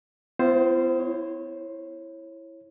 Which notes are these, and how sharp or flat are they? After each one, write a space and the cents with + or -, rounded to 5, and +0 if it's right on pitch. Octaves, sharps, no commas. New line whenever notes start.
B3 +45 F4 -45 C5 +5
E4 +0 C#5 -25